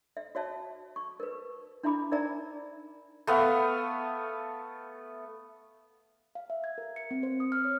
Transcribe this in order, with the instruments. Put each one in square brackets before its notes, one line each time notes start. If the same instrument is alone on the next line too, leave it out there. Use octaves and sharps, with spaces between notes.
[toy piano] E5
F#4 C#5 E5 A5
C#6
A#4 B4
D4 E4 E5 A#5 B5 D6
D#4 A#4 D5 E5 G#5 A#5
[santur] A3 B3 F5
[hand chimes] F5
E5
G#6
A#4
C#7
C4
C5
D#6
F6
C#5